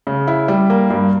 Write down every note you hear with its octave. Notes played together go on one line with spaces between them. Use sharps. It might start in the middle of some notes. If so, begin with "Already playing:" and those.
C#3
E4
G3
A#3
G2